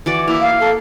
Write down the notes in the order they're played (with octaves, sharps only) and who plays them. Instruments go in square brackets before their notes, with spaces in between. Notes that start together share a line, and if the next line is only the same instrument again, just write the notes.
[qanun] E3 F#4 D5
[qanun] A#3 [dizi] E4
[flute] F5
[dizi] A4